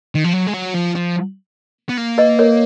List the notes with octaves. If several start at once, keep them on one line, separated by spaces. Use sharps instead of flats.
D#3
F3
F#3
G#3
F#3
F3
F3
B3
A#3
B4 D#5
A#4 C#5